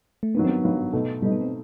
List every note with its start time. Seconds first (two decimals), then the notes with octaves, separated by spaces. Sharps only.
0.23 A3
0.35 G2 D#3 F#3 B3
0.44 C4
0.49 B3
0.63 G2 D#3 F#3
0.93 B2 A3 D#4
1.22 B2 G3 A3 D#4
1.32 B3
1.41 C4